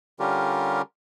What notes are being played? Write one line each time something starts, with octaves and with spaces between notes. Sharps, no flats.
D3 G3 C#4 F4 G4 A#4